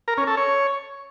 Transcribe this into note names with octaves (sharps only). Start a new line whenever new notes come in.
A#4
C#4
A4
C#5